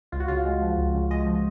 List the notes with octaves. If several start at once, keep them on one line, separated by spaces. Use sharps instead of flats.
C#2 F4
F#4
C#3 F4
G#3
F3
C#2
C#3
G#3 D#5
F3